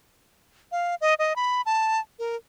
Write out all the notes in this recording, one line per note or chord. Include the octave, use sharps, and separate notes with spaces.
F5
D#5
D#5
B5
A5
A#4